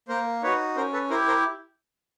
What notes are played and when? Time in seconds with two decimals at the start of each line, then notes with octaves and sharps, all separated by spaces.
0.08 A#3 A#4 C5
0.43 D#4 F#4 B4 C#5
0.76 C#4 A#4 C5
0.93 A4 B4
1.10 E4 G4 A#4 C5
1.28 A#4 C5